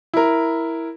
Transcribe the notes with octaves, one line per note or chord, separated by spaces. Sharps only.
E4 A#4